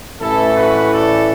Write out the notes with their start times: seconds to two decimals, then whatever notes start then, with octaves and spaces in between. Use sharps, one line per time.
0.20 A1 A2 E3 A3 E4 A4
0.56 F#4 B4
0.92 A4 D5